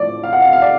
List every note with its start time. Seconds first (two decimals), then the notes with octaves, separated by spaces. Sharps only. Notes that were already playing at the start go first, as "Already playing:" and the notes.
Already playing: A2 F3 D5
0.23 F5
0.33 F#5
0.42 F5
0.53 F5
0.62 D5